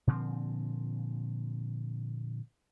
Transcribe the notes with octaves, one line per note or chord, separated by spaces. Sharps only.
A#2 D3 F3 C4